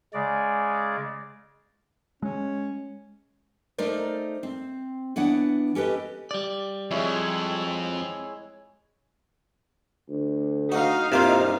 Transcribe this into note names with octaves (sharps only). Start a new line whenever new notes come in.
C#3 G#3 D5
G#3 C#4
A3 D#4 A#4 C5 D5
C4
E3 B3 D4 C#5 F#5
C#4 G4 A4 B4 D#5
G3 D5
F2 G#3 E4 C#5
D2
D#4 F#4 F5
C2 G2 C3 A#3 F4 E5